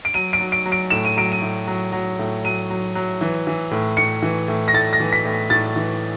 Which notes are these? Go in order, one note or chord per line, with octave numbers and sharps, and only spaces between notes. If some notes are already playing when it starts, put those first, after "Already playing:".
D7
F#3 D#7
D7
F#3
D7
F#3
D7
A2 E7
D#7
F#3 D7
D#7
A2
F#3
F#3
A2
F#3 D#7
F#3
F#3
E3
E3
A2
A2 C#7
E3
A2
A#6
A2 A6
A#6
E3
B6
A2
A2 A6
E3